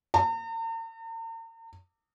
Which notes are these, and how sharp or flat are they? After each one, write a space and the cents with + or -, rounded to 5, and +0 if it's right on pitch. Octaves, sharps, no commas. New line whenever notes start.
A#5 -45